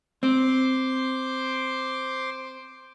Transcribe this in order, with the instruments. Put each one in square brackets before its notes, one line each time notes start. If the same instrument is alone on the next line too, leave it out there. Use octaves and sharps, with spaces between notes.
[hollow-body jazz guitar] C4 [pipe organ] C5 C6 D6